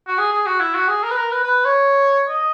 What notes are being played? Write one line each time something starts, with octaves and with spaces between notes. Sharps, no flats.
F#4
G#4
G#4
F#4
E4
F#4
G#4
A#4
B4
A#4
B4
B4
C#5
D#5